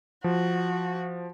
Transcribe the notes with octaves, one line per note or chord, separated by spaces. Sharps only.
F3 F#4